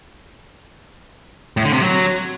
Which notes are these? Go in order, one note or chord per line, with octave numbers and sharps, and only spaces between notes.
A2
D3
C3
F#3